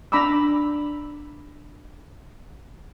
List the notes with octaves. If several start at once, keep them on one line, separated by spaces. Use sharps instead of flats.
D4 A#5 B5 D6 E6